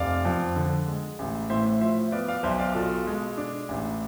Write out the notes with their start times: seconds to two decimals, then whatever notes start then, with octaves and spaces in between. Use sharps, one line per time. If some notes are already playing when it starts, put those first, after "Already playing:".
Already playing: F1 D5 F5
0.25 F2
0.56 D3
0.88 G#3
1.19 A1
1.50 A2 C5 E5
1.81 F3 C5 E5
2.12 B3 D5 F5
2.28 D5 F5
2.43 B1 C5 E5
2.59 D5 F5
2.75 B2 F4 A4
3.07 G#3
3.37 D4
3.69 A1